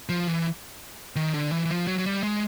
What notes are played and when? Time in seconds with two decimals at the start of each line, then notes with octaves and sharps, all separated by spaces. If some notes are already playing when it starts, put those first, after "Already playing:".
0.09 F3
0.28 E3
1.16 D#3
1.34 D3
1.52 E3
1.65 E3
1.71 F3
1.87 F#3
1.99 F#3
2.06 G3
2.23 G#3